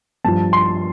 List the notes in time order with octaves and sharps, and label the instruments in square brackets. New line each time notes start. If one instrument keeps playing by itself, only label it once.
[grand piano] G2 F3 A5
C6